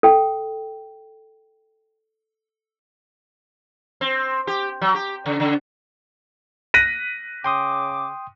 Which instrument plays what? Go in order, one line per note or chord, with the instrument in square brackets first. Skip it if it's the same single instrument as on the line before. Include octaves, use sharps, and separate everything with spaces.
[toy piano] A4 G5
[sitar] C4
G4
F#3
G4
C#3
C#3
[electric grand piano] F#6 A#6 B6 [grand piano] D#7
[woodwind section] C#3 D6 [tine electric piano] G5 C6 D#6